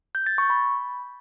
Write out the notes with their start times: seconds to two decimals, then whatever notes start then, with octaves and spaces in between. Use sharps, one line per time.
0.15 G6
0.26 A6
0.38 C#6
0.50 B5